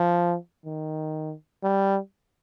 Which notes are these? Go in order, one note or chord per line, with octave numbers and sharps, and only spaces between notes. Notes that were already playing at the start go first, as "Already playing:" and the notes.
Already playing: F3
D#3
G3